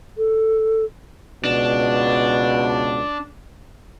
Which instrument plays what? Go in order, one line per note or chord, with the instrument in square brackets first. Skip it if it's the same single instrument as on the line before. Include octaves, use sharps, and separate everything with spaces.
[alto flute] A4
[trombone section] C#2 B2 [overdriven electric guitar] D4